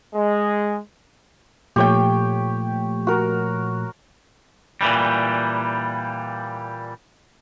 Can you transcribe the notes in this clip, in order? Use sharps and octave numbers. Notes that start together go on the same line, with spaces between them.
G#3
A#2 F3 A3 G4 C#5 G5
F#4 A#4
A#2 E3 G3